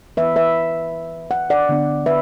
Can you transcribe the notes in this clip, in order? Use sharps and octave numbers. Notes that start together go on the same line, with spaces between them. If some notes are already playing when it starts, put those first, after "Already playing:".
E3 B3 E4 B4 E5
B4 E5
F#5
D5 F#5
D3 B3 D4
B4 E5